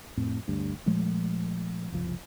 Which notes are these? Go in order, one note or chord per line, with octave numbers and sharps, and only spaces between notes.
F2 A2 C4
D2 G2
A#2 F3 G#3 A3
F#1 C2 F3